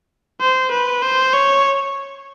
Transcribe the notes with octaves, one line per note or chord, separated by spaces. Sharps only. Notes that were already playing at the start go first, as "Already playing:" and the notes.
C5
B4
C5
C#5